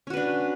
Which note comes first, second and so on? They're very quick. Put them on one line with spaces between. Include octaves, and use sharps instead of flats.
C#4 F#4 B4 D4